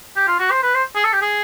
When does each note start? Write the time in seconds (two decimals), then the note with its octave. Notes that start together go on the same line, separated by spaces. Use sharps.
0.16 G4
0.28 F4
0.39 F#4
0.51 C5
0.63 B4
0.75 C5
0.95 G#4
1.04 A4
1.13 G4
1.22 G#4